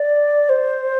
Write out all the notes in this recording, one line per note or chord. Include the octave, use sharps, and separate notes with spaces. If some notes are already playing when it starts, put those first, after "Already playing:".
Already playing: D5
C5